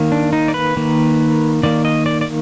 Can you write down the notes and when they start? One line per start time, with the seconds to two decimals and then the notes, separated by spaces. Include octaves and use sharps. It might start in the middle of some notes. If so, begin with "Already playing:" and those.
Already playing: D#3 A#3
0.12 D4
0.33 D#4
0.48 D5
0.54 B4
0.77 D#3 A#3
1.63 D#3 A#3 D5
1.85 D#5
2.06 D5
2.21 D5